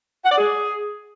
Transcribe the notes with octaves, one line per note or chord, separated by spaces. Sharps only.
F#5
D5
G#4